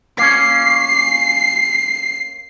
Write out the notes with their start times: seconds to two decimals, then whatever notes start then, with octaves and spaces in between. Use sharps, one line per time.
0.18 A#3 C#4 C7